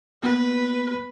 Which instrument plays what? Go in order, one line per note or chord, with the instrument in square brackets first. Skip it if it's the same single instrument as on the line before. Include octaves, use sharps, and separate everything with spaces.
[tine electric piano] A#3 B3 [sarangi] B4